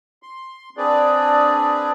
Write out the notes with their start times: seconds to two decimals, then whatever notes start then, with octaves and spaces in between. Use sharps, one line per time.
0.23 C6
0.77 C4 D4 G#4 B4 D5